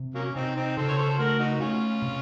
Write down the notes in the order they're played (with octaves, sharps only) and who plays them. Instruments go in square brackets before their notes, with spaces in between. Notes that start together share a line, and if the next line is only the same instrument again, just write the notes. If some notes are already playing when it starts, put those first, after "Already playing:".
Already playing: [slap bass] C3
[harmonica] F#3 A#3 C#4
[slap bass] C3 [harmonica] C4 D#4
[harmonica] C4 D#4
[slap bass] C#3 [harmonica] A4 C5
[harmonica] C#5
A4 C5
A4
[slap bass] A3 [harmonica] F#4 A#4
[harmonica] D#4 F#4
[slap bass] A3 [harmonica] C#4 F4
[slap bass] C3